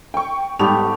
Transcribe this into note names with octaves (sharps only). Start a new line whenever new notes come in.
G5 C#6
G#2 G3 A3 B3 G4 F7